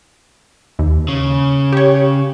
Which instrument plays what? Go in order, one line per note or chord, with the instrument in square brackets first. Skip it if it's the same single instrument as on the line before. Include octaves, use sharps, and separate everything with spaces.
[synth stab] D#2
[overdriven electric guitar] C#3
[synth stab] G4 C#5